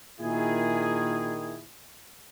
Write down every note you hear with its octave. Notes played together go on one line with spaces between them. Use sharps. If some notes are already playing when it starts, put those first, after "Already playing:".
A#2 D#3 E4 G#4